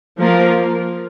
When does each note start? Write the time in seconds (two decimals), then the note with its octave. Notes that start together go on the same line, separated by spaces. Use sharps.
0.19 F3 A#3 F4 A#4